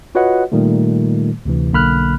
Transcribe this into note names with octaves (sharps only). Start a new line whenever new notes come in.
F4 F#4 B4 C#5 D#5 F#5
A#2 D#3 G3 A3
D2 C3 E3
B1 D3 A#3 B5 F6 F#6